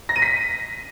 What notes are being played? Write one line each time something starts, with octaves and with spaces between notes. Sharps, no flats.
A#6
D#7
B6